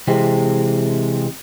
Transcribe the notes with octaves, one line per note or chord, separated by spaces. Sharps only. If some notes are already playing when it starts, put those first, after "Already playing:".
C3 E3 G#3 C4